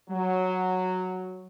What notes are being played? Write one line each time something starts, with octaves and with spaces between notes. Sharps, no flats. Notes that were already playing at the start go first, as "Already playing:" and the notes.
F#3